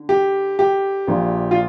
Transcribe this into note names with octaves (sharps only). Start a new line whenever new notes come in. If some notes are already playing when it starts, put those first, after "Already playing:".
Already playing: D3
G4
G4
A#1 A#2 F3
F4